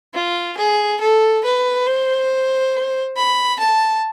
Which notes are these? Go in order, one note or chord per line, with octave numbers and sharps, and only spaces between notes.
F4
G#4
A4
B4
C5
B5
A5